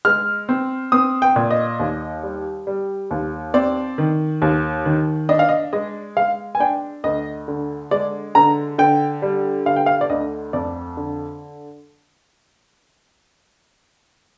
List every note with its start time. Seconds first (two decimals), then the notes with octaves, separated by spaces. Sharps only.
0.05 G#3 F6
0.49 C4
0.92 C4 D#6
1.22 G5
1.36 A#2
1.51 D#5
1.79 D#2
2.23 G3
2.67 G3
3.11 D#2
3.54 C4 D5
3.98 D#3
4.42 D#2
4.85 D#3
5.29 D4 D#5
5.39 F5
5.49 D#5
5.73 G#3 D#5
6.17 G#3 F5
6.55 G#5
6.60 D4 G5
7.04 D2 D#5
7.48 D3
7.91 G#3 D5
8.35 D3 A#5
8.78 D3 G5
9.22 G3
9.66 D3 F5
9.76 G5
9.86 F5
10.01 D5
10.10 D2 D#5
10.53 F2 D5
10.97 D3